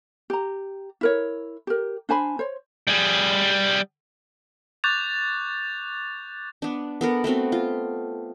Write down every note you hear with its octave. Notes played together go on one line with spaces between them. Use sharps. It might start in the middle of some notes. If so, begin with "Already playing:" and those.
G4 A#5
E4 A#4 C#5
G4 A#4
D4 C5 G#5 B5
C5 C#5
G3 G#4
C#6 D6 F#6 G6 A6 F7
B3 D4
B3 A4 A#4
A3 B3 C4 F#4
F4